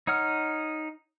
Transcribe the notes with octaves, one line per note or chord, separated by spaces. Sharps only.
D#4 C#5 F#5 F6